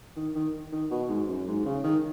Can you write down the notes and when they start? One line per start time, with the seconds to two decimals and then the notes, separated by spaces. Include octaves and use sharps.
0.17 D#3
0.35 D#3
0.72 D#3
0.91 B2
1.09 G#2
1.28 F#2
1.48 G#2
1.66 C#3
1.84 D#3